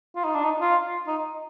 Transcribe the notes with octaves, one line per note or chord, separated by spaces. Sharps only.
F4
D#4
D4
D#4
F4
D#4